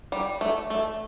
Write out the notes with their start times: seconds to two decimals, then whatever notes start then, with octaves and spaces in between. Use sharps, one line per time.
0.12 G3
0.41 A3
0.70 A3